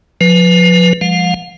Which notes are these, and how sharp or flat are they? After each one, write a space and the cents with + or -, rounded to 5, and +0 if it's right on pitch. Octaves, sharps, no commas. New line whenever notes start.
F3 +30 B4 +0
F3 +0 G#3 -45 F5 +40